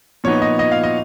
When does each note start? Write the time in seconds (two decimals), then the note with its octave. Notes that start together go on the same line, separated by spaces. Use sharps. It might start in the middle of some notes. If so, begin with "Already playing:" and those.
0.24 A#2 F3 B3 D#4 C#5
0.42 D#5
0.59 D#5
0.72 F5
0.84 D#5